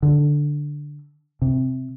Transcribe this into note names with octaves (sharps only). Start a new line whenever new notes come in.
D3
C3